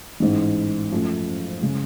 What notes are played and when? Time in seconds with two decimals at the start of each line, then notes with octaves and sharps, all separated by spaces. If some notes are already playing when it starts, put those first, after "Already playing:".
0.20 A1 G#2 G#3
0.91 F#2 F3 A3
1.62 C#3 G#3